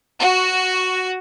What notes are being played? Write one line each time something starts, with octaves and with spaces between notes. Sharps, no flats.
F#4